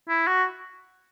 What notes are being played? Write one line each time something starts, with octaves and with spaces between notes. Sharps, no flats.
E4
F#4